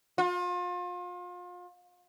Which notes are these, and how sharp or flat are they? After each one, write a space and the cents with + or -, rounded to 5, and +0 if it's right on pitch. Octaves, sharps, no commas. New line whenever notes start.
F4 +35